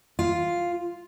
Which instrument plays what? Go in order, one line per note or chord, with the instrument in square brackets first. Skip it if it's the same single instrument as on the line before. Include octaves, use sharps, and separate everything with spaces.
[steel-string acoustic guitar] F4